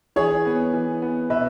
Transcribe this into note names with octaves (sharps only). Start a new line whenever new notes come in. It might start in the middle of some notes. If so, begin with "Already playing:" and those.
E3 G#4 C#5
B3
E3
B3
B2 B4 E5